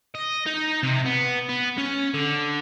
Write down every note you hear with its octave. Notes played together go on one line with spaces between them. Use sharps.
D#5
D#4
C3
B3
B3
C#4
D3